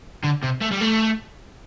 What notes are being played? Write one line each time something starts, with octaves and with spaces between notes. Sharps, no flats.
D3
C3
A3
G3
A3